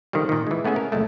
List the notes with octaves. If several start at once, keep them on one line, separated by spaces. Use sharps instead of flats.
D3 D#3 F3 G3
A#2 D#3
E3 G#3
A3 B3 C#4 G#4 E5
A#4
C2 F2 G#3 A3